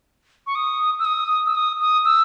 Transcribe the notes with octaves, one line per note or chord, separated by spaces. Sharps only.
C#6
D#6
E6
D#6
E6
D#6
D#6
E6